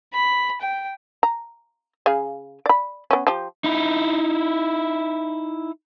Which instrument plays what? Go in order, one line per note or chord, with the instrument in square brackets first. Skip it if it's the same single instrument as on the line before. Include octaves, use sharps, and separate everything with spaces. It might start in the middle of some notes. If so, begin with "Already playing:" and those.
[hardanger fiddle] B5
G5
[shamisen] A#5
C#3 G#4 F5
D5 B5
B3 C#4
F3 G4
[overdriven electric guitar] D#4 E4